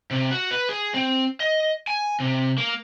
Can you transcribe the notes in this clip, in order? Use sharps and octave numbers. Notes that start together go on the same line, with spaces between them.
C3
F#4
B4
G#4
C4
D#5
G#5
C3
A#3